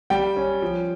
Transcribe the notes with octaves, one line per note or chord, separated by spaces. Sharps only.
G3 G5
C#4
F3